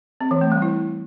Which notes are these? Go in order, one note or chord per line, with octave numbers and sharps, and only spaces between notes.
C4
E3
A3
G3
E4